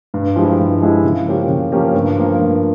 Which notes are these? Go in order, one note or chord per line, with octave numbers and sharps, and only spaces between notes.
G2
F3 G#3 E4 G4
G2
F3 G#3 E4 G4
C#3
F3 A#3 C#4 G4
C#3
F3 A#3 C#4 G4
G2
F3 A#3
G2